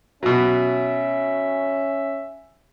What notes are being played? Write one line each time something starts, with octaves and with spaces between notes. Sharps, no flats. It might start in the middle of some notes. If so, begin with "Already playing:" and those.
B2 F#3 C#4 E5